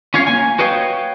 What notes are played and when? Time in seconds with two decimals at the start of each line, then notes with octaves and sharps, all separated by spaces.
0.14 C#4 F4 C#5 F5
0.27 A#3 G#5
0.59 F#4 B4 C#5 D#5 F5 G5